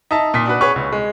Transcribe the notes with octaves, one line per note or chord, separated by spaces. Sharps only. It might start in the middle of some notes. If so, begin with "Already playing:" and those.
D#4 E5 A5
A#2 D#6 B6
D4 F#4 B4
G#4 B4 C#5 C#6
C#2
G#3